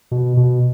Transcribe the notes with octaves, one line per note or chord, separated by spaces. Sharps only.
B2
B2